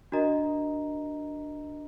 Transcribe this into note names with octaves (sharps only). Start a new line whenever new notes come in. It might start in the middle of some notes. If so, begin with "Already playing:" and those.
D4 F#4 A#4 D#5 A#5